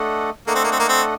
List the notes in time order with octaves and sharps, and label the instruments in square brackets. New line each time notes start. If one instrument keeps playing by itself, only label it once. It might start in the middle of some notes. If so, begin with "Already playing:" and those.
Already playing: [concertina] A3 D4 A4 D#5 F#5
[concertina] A3 D4 A4 D#5 F#5 [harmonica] A#3
[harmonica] C4
A#3
C4
A#3
C4